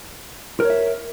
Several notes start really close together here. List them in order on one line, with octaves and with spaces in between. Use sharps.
A#4 C#5 E5